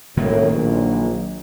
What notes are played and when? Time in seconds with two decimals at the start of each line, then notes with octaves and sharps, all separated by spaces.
0.17 G#1 F#2 A2 D#3 F#3 A#3
0.50 A#1